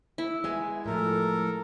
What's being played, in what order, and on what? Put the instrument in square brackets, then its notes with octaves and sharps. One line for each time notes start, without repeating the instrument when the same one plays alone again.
[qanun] E4
[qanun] G#3 [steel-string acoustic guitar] B3 E5 G#5
[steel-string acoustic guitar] A2 F3 [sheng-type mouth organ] A4 A#4